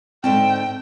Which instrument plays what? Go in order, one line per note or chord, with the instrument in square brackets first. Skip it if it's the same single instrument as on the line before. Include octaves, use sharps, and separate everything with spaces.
[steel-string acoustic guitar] G#2 D3 A5 [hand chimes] C4 [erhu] G5